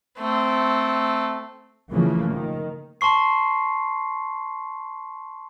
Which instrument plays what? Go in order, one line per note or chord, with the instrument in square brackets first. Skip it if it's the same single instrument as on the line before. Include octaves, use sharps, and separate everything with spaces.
[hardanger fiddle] A3 C4
[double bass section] C#3 E3 F3 A3 A#3
D#3
[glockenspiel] A5 C6 C#6 C7